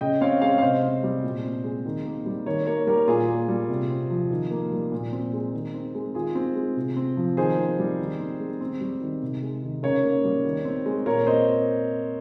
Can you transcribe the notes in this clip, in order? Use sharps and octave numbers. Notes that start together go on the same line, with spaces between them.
C#3 D#5 G5
C4 C#5 F5
G#3 C#5 F5
F5
C3 C5 D#5
C4
G3
A#2
C4
G#3
D#3
A#3
G3
D#3 A#4 C#5
A#3 A#4 C#5
G3 G4 A#4
A#2 F4 G#4
A#3
G3
C3
C4
F3
D#3
A#3
G3
A#2
C4
G#3
D#3
C4
G#3
D#3 F4 G#4
C4
G#3
C3
C4
F3
D#3 G#4 C5
C4
G3
D#3
C4
G#3
C4
G3
D#3
C3
G#3
D#3
C#3 A#4 C#5
A#3
G3
D#3
C4
G#3
A#2 A#4 C#5
C4 C5 D#5